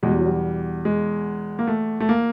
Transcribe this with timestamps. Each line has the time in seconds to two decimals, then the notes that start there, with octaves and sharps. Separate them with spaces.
0.03 E2 B2 G#3
0.10 G3
0.18 F#3
0.25 G3
0.85 G#3
1.59 A#3
1.67 A3
2.00 A3
2.09 A#3